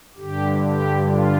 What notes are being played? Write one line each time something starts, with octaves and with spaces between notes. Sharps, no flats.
G2 D3 G4
G4
F4